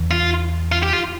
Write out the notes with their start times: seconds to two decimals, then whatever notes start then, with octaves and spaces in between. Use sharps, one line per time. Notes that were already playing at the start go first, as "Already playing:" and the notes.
Already playing: E2
0.11 F4
0.72 F4
0.83 G4
0.93 F4